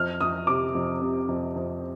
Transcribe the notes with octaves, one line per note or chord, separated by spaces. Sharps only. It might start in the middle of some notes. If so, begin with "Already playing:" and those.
Already playing: F2 F6
F2 D#6
C3 D6
F2
C3
F2
F2